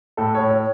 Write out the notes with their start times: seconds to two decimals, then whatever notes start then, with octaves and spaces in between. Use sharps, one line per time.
0.17 A2 A4
0.35 A2 C#5
0.50 C#5